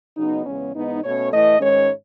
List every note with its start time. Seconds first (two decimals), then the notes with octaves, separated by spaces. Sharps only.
0.17 C#3 F#3 B3 D#4
0.46 E2 C#3 G#3 B3 C#4
0.75 G#2 E3 B3 D#4
1.03 B2 A3 C#4 C#5
1.32 A2 E3 A3 D#5
1.60 G#2 D#3 G#3 C#4 C#5